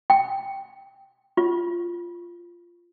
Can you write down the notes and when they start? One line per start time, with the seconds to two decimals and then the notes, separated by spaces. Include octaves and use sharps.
0.10 G5
1.37 F4